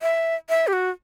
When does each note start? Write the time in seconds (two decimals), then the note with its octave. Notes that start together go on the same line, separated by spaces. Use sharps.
0.02 E5
0.49 E5
0.67 G4
0.73 F#4